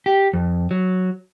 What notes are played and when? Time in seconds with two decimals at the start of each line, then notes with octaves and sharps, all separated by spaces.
0.06 G4
0.33 F2
0.71 F#3